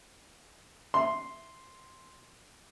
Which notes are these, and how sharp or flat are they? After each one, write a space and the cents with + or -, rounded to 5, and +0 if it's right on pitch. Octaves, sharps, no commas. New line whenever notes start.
C6 +0